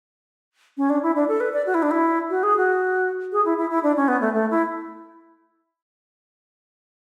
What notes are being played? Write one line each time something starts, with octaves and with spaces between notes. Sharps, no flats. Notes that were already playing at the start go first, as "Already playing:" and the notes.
C#4
D4
E4
D4
A4
B4
D5
F#4
E4
D4
E4
F#4
G#4
F#4
G#4
E4
E4
E4
D4
C#4
B3
A3
A3
E4